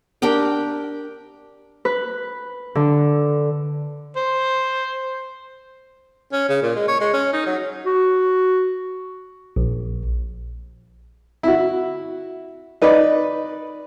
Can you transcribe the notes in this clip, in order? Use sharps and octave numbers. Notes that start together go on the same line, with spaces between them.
D4 G4 A#4 G5
B4
D3
C5
C#4
C#3
A#2
G#3
C#5
G#3
C#4
D#4
F#3
F#4
A#1
E4 F#4
D#4 B4 D5